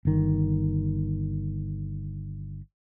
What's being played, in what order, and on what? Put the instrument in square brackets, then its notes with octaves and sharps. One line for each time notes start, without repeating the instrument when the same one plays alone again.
[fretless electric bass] G1 D#3